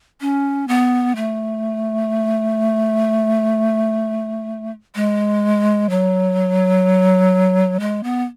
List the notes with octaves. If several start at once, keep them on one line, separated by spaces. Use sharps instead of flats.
C#4
B3
A3
G#3
F#3
G#3
B3